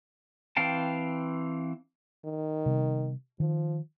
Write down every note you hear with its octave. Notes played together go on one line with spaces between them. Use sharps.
E3 C4 F5 G5 A5
D#3
C3 G3 B3
D#3 F3